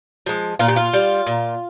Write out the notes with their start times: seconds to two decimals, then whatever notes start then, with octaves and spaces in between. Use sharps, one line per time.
0.26 F3 G#3
0.59 A#2 F4
0.68 G4
0.76 F4
0.93 G3
1.26 A#2